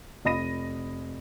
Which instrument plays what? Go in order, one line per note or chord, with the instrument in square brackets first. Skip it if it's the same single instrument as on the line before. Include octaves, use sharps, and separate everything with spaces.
[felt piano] F1 D#5 B5 A#6 D#7